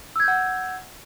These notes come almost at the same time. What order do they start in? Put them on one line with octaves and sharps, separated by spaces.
E6 G#6 G6 F#5